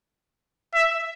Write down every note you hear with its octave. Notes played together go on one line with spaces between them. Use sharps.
E5